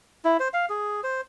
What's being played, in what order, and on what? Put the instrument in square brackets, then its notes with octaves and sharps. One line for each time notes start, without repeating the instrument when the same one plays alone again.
[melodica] E4
C5
F5
G#4
C5